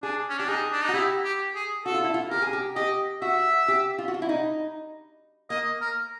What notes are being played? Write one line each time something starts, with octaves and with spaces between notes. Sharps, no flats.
D4 G#4
C#4
D4 G4
D#4 G#4
D4
D#4 F#4
E4 G4
G4
G#4
F#4 A4
F4
E4
F4
G4 A#4
G#4
G4
G4 D#5
F#4 E5
G4
F4
F#4
F4
E4
D#4
A#3 D#5
A#4